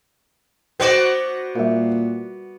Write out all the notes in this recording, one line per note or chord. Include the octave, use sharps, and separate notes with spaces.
B3 F#4 C5 D5
A#2 G3 A#4